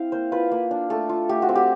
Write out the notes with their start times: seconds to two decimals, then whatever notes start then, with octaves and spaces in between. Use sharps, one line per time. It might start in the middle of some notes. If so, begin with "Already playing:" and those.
Already playing: C4 E4 F5
0.12 A#3 C5
0.32 F4 B4
0.51 A#3
0.71 D4
0.90 A3 A4
1.09 F4
1.29 A3 G4
1.42 F#4
1.49 C4
1.55 G4